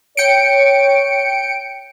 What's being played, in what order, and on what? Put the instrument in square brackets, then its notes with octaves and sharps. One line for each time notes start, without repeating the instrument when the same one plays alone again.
[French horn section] C#5 [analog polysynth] G5 C#7 D7